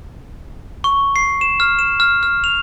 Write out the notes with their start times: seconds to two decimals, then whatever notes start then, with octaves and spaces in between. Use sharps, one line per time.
0.84 C#6
1.16 C7
1.41 E7
1.60 F6
1.79 E7
2.00 F6
2.23 F6
2.44 F7